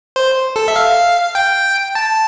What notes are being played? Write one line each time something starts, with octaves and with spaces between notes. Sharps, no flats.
C5
A4
E5
F5
G5
A5